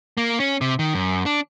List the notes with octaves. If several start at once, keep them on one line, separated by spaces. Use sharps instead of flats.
A#3
C#4
C3
D#3
F#2
D4